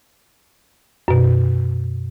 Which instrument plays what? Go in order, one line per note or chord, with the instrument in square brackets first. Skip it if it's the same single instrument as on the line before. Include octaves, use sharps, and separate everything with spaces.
[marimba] F#2 B2